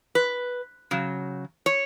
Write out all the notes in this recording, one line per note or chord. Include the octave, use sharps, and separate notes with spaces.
B4
C#3 F#3
C#5